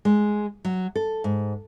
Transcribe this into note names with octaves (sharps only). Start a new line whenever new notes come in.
G#3
F#3
A4
G#2